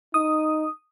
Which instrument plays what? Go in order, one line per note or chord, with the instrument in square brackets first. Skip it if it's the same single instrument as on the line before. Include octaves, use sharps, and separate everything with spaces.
[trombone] D#4 [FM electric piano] D#6